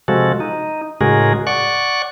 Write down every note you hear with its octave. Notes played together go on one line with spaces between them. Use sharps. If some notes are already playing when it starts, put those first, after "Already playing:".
C3 F3 G#3 F#4 A4
D#4
A2 C#3 G#3 F#4 G#4 A#4
D5 F#5 C#6